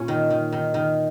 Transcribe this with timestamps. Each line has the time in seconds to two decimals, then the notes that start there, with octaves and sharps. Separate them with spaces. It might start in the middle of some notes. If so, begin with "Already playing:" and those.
Already playing: A#2 C#4
0.08 D#3
0.30 D#3
0.52 D#3
0.74 D#3